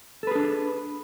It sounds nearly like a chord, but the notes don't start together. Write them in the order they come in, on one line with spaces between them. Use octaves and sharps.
A4 B4 G#4 D4